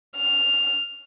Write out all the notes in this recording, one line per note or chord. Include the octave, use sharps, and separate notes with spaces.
F6